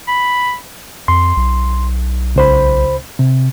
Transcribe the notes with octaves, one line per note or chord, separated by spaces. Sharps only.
B5
F2 C6
B1
C#2 C5 B5
C3